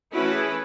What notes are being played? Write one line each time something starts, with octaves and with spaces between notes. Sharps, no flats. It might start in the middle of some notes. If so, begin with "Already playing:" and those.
E3 A3 C#4 E4 F#4 B4
G#4